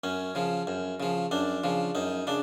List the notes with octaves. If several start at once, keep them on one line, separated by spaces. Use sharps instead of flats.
F#2 C#4
C#3 F3
F#2
C#3 F3
F#2 D4
C#3 F3
F#2 D#4
C#3 D4